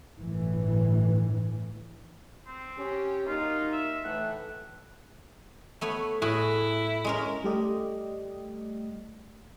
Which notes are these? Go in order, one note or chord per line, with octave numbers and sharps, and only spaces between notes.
G1 A2 E3
C4
C#4 G4
F#2 A#3 D#4 F4
E5
A2 E3 A3 F#5
A3 B3 C#5
A2 E4 F#4 G#4
G#3 C#4 A#4
G3 A3 G4 D5 D#5